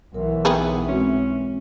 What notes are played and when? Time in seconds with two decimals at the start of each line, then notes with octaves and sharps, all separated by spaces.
0.14 B1 E3 A#4
0.45 D#3 B3 G#4 B4
0.88 G#3 C4 C#4 F#4